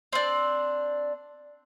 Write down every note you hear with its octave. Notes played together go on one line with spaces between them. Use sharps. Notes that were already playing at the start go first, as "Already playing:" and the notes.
C4 D4